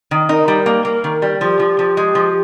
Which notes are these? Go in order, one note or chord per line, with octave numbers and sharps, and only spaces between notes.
D#3
D#4 A#4
G3
A#3
A#3
D#3
G3
F3 G4
F3
F3
G#3
F3